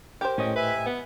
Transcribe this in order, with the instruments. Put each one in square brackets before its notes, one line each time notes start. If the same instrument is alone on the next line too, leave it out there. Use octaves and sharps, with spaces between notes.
[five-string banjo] G4 A#4 C5
[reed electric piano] A2 D#5 G5 [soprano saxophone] C#4
[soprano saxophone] B4 [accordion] E5 G#5
[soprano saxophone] B3